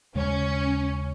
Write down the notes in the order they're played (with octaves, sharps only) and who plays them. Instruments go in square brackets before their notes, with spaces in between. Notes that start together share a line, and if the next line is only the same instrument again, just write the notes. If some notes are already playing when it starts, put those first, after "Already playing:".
[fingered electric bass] D#2 C#3 G#3 [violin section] C#4